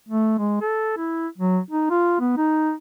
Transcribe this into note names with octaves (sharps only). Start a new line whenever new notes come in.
A3
G#3
A4
E4
F#3
D#4
F4
B3
D#4